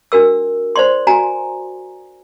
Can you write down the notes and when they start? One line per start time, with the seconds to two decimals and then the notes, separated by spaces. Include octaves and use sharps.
0.12 D4 F#4 A#4 E6
0.76 C5 D5 C6
1.07 F#4 G#5 A#5